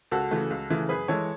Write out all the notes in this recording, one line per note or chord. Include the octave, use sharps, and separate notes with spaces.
C#2 F#4 A4
C#3 E3 A3
C#2
C#3 E3 A3
F#2 G#4 B4
E3 G#3 A4 C#5